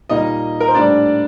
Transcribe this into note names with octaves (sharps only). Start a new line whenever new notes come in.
A#2 G3 A#3 D#4 D#5
A#4
C5
A2 G3 A#3 D4 D5